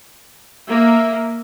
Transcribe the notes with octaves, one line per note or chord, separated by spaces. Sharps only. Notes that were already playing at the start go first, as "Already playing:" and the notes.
A#3 E5